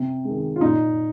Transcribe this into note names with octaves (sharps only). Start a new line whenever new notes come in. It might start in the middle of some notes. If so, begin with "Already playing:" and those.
Already playing: C3
D#3 G#3
F4
A#2 D#4